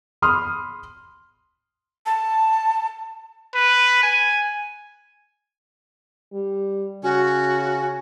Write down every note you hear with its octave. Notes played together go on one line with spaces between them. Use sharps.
B5 C6 D#6 F6
A5
B4
G#5
G3
C#3 C#4 F#4